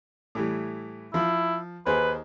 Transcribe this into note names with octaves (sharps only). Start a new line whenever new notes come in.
A2 E3 G3
F3 E4
D#2 G#4 B4 C5